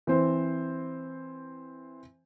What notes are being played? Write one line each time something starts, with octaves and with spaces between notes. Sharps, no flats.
E3 C4 C5